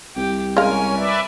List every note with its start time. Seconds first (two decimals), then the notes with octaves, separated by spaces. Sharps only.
0.17 C2 G4
0.57 G#3 C#4 A#4 F5 G#5
0.96 B4 D5 E5